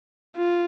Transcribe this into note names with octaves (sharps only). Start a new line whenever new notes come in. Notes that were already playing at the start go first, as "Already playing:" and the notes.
F4